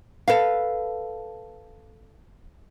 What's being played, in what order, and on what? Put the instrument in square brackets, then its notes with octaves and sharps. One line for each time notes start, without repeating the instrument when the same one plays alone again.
[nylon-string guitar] A4 B4 F5